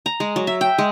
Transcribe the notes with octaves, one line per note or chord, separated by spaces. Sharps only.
A#5
G#3
F#3
E5
G5
G#3